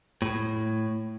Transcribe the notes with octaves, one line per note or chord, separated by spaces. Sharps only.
A2